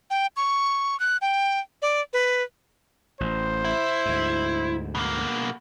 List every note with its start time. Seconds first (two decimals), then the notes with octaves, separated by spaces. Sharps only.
0.10 G5
0.37 C#6
1.00 F#6
1.22 G5
1.82 D5
2.13 B4
3.20 A1 C5
3.65 E4
4.06 D2 G#2
4.95 B2 A#3